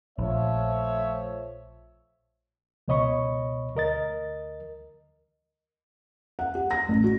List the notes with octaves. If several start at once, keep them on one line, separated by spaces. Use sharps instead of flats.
A#1 F3 A3 C#5 E5
C#2 B2 C#5 D#5 B5 C#6
D2 A#4 D#5 A6
F#5
G4
A#6
A1
F#4